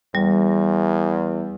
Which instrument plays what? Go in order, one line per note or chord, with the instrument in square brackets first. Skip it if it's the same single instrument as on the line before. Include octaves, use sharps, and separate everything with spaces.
[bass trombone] E2 [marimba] G3